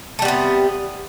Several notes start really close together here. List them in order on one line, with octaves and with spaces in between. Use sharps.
A3 G3 B3 C3